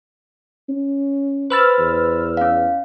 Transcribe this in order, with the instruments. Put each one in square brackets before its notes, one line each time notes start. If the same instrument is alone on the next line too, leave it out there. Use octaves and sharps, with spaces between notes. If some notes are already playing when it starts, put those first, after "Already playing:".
[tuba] C#4
[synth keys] B4 E6 F6 [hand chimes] C5 B5 A6
[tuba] E2
[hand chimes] C#4 F5